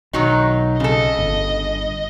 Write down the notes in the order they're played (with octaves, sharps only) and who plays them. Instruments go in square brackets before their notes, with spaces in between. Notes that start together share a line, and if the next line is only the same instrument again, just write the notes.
[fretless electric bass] B1 [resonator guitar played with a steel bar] D#3 F#3 D#4
[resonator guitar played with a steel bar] C#3 A4 [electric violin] D#5
[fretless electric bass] G1